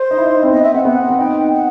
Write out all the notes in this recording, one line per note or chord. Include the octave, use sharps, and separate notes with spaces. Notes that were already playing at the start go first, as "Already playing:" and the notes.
Already playing: C5
D#4
E4
D#4
E4
C4
B3 D#5
E5
C4 F#5
B3 F#5
C4
D#4 G5
F#5